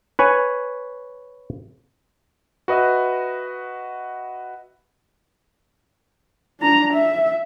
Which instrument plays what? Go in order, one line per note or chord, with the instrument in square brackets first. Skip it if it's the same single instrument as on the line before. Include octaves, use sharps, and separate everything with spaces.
[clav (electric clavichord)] B4 C#5 G#5
[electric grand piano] F#4 B4 D#5 E5
[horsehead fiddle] D4 A#5
E5